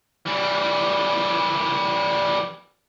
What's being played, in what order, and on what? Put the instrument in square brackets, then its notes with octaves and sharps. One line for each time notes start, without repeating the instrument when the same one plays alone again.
[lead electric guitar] E3 G3